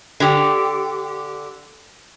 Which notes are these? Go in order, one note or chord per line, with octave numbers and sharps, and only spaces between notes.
D3 G4